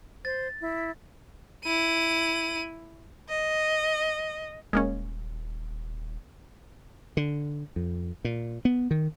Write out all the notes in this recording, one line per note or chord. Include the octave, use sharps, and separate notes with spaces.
C5 A6
E4
E4 D#7
D#5
D#1 G#3 A#3 C#4
D3
F2
A#2
B3
D#3